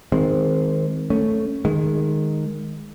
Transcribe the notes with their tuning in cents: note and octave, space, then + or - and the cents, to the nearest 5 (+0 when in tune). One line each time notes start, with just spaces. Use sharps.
D#3 +20 G#3 +0 C4 +0
A3 +5 C#4 +0
D#3 -10 G#3 +0